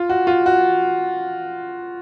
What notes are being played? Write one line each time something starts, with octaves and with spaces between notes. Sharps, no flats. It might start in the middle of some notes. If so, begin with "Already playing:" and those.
Already playing: F4
F#4
F4
F#4